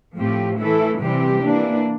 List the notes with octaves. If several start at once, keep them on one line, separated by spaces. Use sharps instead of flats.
A2 F3 C4 G4
E3 A3 E4 A4
C3 E3 G3 C4 G4
E3 A#3 D4